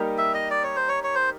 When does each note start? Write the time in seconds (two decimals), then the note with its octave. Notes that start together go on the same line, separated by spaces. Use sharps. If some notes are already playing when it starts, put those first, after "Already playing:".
Already playing: G3 A#3 D#4 G4 A#4
0.18 E5
0.34 D#5
0.50 D5
0.64 C#5
0.76 C5
0.89 C#5
1.03 C#5
1.15 C5